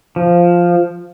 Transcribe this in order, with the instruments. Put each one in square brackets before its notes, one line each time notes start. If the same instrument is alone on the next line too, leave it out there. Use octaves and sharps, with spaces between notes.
[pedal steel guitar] F3